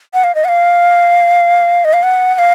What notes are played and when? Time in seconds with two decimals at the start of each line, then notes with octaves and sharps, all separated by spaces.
0.14 F#5
0.24 F5
0.35 D#5
0.45 F#5
0.49 F5
1.85 D#5
1.93 F5
2.03 F#5
2.35 F#5
2.39 F5